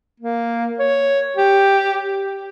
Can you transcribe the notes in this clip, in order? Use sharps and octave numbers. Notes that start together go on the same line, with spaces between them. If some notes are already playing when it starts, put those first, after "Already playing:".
A#3
C#5
G4